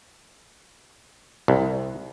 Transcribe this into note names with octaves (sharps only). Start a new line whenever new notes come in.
C2